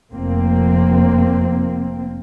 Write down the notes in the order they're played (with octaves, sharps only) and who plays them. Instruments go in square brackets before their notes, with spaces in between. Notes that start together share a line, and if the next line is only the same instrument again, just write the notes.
[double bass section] F1 F3 A#3 C4